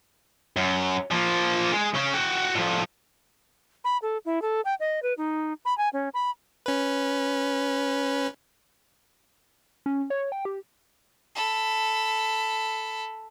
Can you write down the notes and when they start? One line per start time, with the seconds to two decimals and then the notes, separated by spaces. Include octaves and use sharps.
0.57 F#2
1.11 F3 A#3
1.72 G#3
1.95 C#3 C#4
2.14 F#4 G5
2.55 A2 F3
3.84 B5
4.02 A4
4.25 E4
4.42 A4
4.65 G5
4.80 D#5
5.03 B4
5.18 D#4
5.65 B5
5.78 G#5
5.93 C#4
6.14 B5
6.66 C#4 B4
9.86 C#4
10.10 C#5
10.32 G5
10.45 G4
11.35 A4 B5